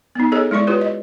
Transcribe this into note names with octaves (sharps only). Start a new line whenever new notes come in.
B3 D#4
B3 D4 G#4 A4 C#5 D#5
G#3 E4 D5 C#6
E4 F4 G4 B4 C#5
D#5